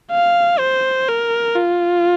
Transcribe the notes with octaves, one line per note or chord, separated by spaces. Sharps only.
F5
C5
A#4
F4